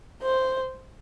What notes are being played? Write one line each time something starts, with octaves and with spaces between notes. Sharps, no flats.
C5